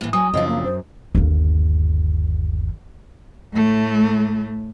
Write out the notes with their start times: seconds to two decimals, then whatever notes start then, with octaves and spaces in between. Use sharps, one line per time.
0.01 A2 E3 A#3
0.13 F#3 G#5 D#6
0.34 F#2 C#3 F3 C4 D4 D#5
0.47 A#3
0.64 F#2 C5
1.15 G1 D#2
3.53 A2 A3